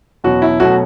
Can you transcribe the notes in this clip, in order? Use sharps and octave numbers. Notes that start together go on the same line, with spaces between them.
E2 B2 F#3 C#4 F#4
E4
B2 F#3 A3 C#4 F#4